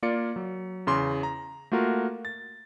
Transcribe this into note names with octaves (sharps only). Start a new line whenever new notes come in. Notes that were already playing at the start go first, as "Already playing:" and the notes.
A#3 F4 D5 C#7
F#3
E2 C#3 C6 D6
A#5
A3 A#3 F4 F#4 A#4
A6